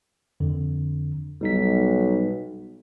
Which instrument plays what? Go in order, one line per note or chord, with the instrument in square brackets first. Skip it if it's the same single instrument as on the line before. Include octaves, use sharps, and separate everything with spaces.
[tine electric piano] F2 D3
[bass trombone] B1 [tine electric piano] G3 D#4 B6